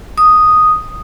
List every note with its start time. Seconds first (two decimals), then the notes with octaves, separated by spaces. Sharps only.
0.18 D#6